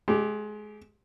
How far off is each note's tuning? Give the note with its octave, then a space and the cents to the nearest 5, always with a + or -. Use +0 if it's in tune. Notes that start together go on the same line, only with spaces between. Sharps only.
G#3 +25 G4 +0